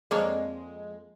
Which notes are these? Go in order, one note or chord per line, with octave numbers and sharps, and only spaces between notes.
F2 G#3 A#3 D4 C#5